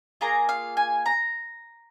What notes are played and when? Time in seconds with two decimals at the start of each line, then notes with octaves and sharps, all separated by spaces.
0.21 A#3 F4 G#4 A#5
0.49 F5
0.77 G#5
1.06 A#5